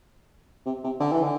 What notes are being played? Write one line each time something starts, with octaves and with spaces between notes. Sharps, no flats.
C3
C3
D3
E3
D3